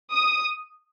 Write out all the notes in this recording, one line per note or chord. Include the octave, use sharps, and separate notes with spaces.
D#6